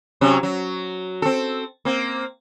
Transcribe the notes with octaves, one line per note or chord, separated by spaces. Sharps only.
C3 F#3 C#4
F#3
C4 A4
A#3 C4